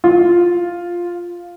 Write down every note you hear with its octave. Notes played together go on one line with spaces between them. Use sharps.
F4